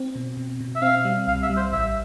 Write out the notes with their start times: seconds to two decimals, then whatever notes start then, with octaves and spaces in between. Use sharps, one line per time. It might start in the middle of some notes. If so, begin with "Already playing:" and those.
Already playing: C4
0.15 B2
0.37 B2
0.61 B2
0.76 E5
0.82 C4 F5
1.05 G3
1.27 C2 F5
1.42 E5
1.50 G3
1.57 C5
1.72 A1 E5